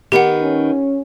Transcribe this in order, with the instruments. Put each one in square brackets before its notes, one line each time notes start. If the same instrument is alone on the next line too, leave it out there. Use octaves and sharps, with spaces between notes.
[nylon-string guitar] D#3 B3 [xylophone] G4 F#5
[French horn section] C#4